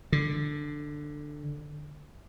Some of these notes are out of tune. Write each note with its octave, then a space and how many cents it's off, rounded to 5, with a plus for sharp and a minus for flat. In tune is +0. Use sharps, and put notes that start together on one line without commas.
D3 +10